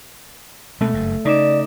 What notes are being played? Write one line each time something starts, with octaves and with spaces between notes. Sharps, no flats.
B2 G#3 A3 C4
F#1 G2
C#3 D#4 D5 D6 E7